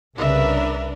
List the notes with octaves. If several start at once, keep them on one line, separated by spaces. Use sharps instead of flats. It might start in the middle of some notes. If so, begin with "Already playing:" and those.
C2 C#3 D4 A#4 B4 E5